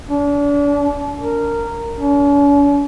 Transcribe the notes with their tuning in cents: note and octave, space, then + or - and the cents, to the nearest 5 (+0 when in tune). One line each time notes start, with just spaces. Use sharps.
D4 -35
A#4 -15
C#4 +45